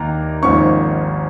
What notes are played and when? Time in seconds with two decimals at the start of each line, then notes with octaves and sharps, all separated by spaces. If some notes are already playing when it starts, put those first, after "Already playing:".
Already playing: D#2 A#3 A#5
0.42 G#1 G#2 F3 A#3 C#4 C#6